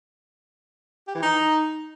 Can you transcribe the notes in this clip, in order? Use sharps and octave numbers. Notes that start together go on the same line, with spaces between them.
G4
E3
D#4